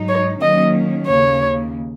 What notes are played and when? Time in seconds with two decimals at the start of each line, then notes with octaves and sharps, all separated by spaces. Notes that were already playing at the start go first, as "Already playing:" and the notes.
Already playing: G#2 F#3 D#4
0.09 C#5
0.40 D#3 F#3 A#3 C#4 D#5
1.07 D#2 C#3 A#3 C#5